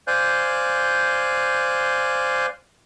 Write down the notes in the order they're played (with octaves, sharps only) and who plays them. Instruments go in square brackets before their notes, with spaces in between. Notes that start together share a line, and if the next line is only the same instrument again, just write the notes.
[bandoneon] C5 D5 F5 G#5 F#6 G6